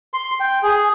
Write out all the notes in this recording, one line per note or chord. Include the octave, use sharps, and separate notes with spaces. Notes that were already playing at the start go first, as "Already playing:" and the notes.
C6
G5
G#4